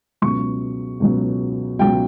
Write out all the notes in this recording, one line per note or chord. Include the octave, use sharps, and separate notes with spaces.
C#2 B2 F#3 C#6
C#2 B2 F#3
C#2 B2 F#3 G5